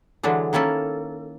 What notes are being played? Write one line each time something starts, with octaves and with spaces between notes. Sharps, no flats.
D3 E3 F#3 G#3 D4
D#3 A#3 C#4 E4 A4